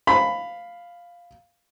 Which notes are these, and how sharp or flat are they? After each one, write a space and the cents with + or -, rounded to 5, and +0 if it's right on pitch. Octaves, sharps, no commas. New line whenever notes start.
F5 +0 B5 +10